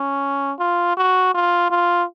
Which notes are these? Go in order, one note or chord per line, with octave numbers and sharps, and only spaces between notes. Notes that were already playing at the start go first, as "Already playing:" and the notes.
Already playing: C#4
F4
F#4
F4
F4